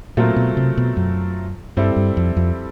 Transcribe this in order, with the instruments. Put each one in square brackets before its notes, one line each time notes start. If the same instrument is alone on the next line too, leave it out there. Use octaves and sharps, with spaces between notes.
[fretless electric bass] A#2 [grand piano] F#3 A3 C4 F4 A#4
[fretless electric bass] B2
C3
B2
F#2
[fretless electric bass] G2 [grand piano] G3 C4 E4 A4
[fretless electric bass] G2
F2
F2